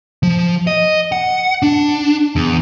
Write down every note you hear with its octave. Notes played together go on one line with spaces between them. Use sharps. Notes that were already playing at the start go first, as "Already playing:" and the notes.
F3
D#5
F#5
D4
E2